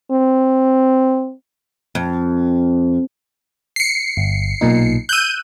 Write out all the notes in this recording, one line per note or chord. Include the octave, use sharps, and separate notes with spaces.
C4
F2
C7 C#7
G1
B1 A#2 D#4
E6 F#6 G6 D#7